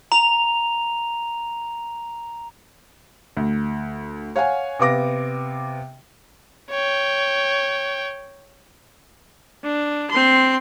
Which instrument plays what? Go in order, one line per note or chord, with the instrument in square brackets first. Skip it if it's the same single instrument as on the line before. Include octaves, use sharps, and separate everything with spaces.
[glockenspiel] A#5 F7
[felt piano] D2
C#5 F5 F#5 G#5
C3 B3 F5 D6 A#6
[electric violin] C#5 G5
[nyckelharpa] D4
C4 C6